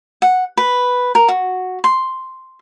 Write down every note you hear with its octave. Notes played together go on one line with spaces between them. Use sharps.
F#5
B4
A#4
F#4
C6